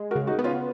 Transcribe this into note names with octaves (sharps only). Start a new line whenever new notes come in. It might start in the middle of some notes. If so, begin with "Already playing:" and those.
Already playing: G#3
F#4 A#4
C#3
D#4 F#4
B3
C#4 F4